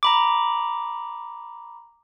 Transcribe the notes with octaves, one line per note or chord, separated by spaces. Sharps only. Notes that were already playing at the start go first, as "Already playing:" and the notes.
A#5 B5 D6